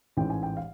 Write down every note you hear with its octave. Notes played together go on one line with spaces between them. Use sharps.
A1 G#2 E3 G5
G#5
G5
F5